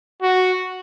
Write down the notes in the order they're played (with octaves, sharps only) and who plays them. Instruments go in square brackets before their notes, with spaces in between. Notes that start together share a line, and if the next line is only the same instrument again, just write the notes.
[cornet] F#4